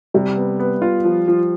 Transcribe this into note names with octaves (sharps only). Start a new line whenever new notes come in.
C3 G3
B3
B3
F4
F3
F3